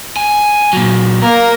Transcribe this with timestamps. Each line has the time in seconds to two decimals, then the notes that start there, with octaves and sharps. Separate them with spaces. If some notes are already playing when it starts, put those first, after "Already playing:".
0.17 G#5
0.73 A#2 F#3
1.22 A#3 A#4